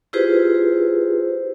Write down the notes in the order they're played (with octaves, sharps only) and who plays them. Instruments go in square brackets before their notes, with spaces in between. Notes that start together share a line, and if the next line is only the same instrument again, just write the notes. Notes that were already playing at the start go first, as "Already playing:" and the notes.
[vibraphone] E4 F4 G4 G#4 B4 C5